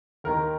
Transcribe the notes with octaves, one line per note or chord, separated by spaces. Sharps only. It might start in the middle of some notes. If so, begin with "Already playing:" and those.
D#2 D#3 A#4